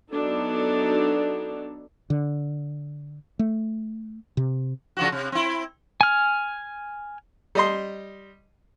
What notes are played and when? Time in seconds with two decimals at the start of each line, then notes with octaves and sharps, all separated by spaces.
0.10 F#3 B3 D4 D#4 F#4 A4
2.10 D3
3.39 A3
4.37 C3
4.97 C#3 F3 F#4
5.12 C3
5.32 C4 E4
6.01 G#5 F6
7.55 G3 D#5 C6